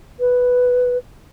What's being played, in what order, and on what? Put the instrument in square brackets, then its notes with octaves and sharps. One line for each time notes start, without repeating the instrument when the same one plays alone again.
[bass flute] B4